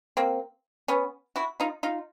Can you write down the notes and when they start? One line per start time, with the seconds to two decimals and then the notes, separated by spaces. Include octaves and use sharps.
0.17 A#3 C4
0.88 B3 C#4
1.36 E4 F#4
1.60 D#4 F4
1.83 D#4 F4